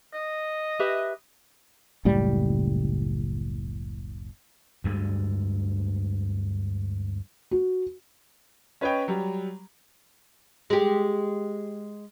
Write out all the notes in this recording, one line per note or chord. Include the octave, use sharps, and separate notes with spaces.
D#5
G4 B4 E5
F#1 C#2 A2 G3
D2 G2 G#3
F#4
C#4 B4 C#5 D#5 G5
F#3 G3
G#3 G4